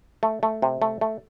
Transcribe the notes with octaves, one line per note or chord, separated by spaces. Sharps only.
A3
A3
C3
A3
A3